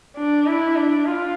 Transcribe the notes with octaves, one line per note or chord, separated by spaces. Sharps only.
D4
E4
D4
F4